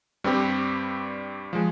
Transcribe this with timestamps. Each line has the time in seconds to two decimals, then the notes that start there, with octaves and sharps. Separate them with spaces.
0.24 G2 G3 C4 G4
1.53 F3 G#3